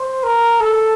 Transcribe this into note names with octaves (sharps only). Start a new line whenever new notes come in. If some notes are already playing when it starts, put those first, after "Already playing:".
Already playing: C5
A#4
A4